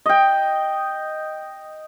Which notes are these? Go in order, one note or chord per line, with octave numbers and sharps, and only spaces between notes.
D#5 G5